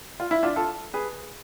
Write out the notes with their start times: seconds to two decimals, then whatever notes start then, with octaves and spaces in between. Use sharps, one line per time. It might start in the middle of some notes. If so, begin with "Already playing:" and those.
0.20 F4
0.31 E4
0.43 D4 F4
0.56 F4 A4
0.94 G#4 B4